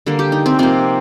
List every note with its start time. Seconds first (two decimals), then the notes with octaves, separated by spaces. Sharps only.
0.06 D3 G3 A#3
0.19 G4
0.32 D#4
0.46 C4
0.59 C3 F3 A#3 C4